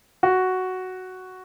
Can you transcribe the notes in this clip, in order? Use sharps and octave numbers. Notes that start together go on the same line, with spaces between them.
F#4